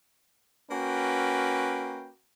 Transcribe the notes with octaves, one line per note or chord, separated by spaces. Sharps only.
A#3 C#4 F#4 B4 G5